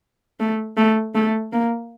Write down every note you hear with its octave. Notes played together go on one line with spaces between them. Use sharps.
A3
A3
A3
A#3